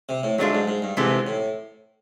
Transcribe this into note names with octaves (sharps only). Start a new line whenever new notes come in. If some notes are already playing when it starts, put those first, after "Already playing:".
C3
A2
G#2 F#3 A3 D4 F4
G#2
G#2
G2
G#2 C3 E3 A3
A2